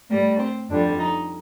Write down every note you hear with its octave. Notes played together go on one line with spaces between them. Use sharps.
A2 G3 A#3
C4
F2 D3 G3 D4
D#4